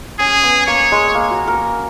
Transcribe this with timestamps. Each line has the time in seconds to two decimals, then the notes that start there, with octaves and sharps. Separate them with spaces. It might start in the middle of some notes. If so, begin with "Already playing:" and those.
0.19 C#4 G#4
0.43 B3
0.67 A#3 C#5
0.92 G#3
1.15 A#3
1.31 F#4
1.48 A#4